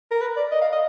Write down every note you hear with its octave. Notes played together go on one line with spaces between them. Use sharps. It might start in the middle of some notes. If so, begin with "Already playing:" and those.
A#4
B4
D5
D#5
F5
D#5